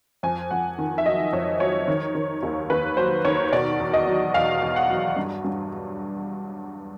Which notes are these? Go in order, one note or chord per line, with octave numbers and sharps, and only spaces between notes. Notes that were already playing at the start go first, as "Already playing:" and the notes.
F2 G#5
F2 F#5
D#3
E5
F#3 D#5
F2 C#5
F#3 C#5
D#3
D#3
D#2
D#2 B4
F#3 C5
D#3 C#5
B2 D5
E2
D#5
F#3
E2 F5
E2
F#5
F#3
G2
G2